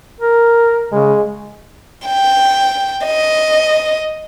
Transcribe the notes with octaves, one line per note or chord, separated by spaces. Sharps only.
A#4
C#3 G#3
G5
D#5